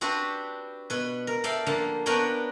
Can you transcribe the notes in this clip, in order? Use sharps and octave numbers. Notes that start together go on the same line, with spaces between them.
C4 D4 F#4 G4 B4
B2 B4
A#4
A4 D5 E5 F5 G5
D3 F3 A#3
B3 D4 A#4 B4 C#5 G5